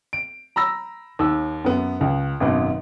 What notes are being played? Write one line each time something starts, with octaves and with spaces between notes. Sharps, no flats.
D7
A#5 B5 E6 A#6
D#2 E6
F#2 B3
C#2
G#1 F#2 B2 B3